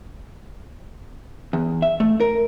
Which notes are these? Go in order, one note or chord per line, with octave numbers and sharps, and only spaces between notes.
E2
E5
A3
A#4